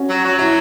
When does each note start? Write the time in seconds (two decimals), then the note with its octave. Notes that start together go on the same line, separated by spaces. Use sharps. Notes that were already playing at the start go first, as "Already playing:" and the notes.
Already playing: C#4 F#4
0.09 F#3
0.24 F#3
0.38 F#3 E4